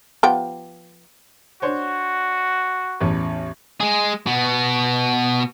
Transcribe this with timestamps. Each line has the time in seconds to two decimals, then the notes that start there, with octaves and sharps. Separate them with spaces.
0.23 F3 B3 G4
1.62 D4 F#4 C5 C#5
3.00 A1 E2 C#4
3.80 G#3 G#4
4.26 B2 B3